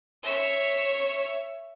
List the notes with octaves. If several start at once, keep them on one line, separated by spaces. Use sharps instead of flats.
C#5 E5